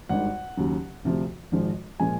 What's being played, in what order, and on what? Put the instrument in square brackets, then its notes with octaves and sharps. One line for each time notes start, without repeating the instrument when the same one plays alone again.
[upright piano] G#1 G2 D#3 F#5
D#2 C#3 F#3
D2 C3 F3
G#1 G#2 F3 G#3
A#2 F3 G#3 G#5